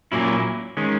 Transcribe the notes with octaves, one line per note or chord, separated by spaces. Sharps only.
A#2 F#3 A#3 C#4 E4
D#3 G#3 C#4